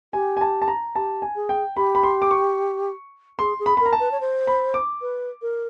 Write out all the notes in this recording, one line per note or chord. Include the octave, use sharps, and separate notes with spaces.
G4 G#5
G#5
A5
A5
A#5
G4 A5
G#5
G#4
G5
G4 B5
B5
C6
D6
C#6
G#4 C6
G#4
B5
A#4 B5
A#5
A5
B4
C#5
C5
B5
D6
B4
A#4